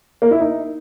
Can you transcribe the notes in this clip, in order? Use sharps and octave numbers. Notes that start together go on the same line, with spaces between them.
A#3
E4
D#4